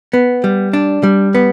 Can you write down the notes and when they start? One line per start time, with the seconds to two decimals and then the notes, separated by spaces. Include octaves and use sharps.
0.13 B3
0.44 G3
0.73 D4
1.03 G3
1.35 B3